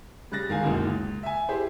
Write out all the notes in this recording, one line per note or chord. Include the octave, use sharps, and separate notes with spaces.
C#3 G3 F#6 A6 A#6
G#2 D#3 G#4 F5 G#5
F#1 C#2 F#2 B2 D#3
C#2
E5 G#5
E4 G4 G#4 C5